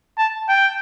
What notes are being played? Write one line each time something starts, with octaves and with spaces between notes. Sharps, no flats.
A5
G5